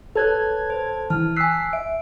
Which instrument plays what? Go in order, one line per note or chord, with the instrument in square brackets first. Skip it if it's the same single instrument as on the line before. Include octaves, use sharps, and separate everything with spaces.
[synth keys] A4 A5 G#6 [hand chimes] B4 C#5 F#6
[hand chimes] C5
[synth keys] E3 [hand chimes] A5 F6
[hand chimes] G#5 F#6 [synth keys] E6 B6 C7
[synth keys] E5 [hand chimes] D7